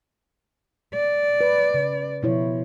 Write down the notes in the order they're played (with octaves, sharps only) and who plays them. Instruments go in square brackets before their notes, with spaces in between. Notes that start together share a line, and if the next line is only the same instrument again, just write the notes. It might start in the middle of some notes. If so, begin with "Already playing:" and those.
[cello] D5
[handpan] B4
C#3
[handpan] B2 E4 C#5 [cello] F3